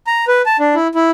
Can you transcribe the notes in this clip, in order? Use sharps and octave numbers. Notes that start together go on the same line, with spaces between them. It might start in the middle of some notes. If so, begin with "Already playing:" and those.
A#5
B4
A5
D4
E4
E4